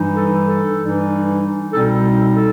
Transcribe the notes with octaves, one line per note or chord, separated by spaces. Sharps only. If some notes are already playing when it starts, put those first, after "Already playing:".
Already playing: G2 E3 G3 D#4
A4
A4
G2 E3 G3 D#4
C2 B2 G3 C4 D#4 A4
A4